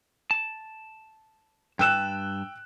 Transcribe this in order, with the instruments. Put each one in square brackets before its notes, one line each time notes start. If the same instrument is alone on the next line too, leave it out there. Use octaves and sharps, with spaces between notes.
[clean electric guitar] A5
[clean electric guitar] G2 B4 A5 [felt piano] G5 E6 F#6